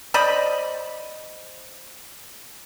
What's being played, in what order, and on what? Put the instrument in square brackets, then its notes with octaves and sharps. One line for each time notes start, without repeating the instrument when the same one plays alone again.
[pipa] C5 D5 D#5 B5